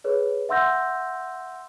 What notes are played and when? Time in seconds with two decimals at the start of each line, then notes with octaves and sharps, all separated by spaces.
0.04 G#4 B4 C#5
0.49 E5 F#5 C6 E6 G6 A#6